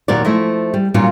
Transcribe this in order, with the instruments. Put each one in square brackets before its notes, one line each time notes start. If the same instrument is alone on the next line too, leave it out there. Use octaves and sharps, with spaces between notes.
[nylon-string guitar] D#2 A#2 F#3 A#4 D5
F3 A3 E4 D#5
G3
A#2 F#3 G3 C#4 D#4 F4